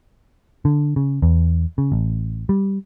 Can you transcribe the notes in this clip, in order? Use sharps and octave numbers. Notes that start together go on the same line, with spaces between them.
D3
C#3
E2
C#3
A1
G3